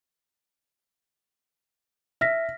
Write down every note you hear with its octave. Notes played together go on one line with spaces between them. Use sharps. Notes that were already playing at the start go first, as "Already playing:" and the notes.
E5 F6 A#6 B6